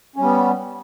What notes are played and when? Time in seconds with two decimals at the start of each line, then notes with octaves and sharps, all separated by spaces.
0.16 C#4
0.19 G3
0.23 B3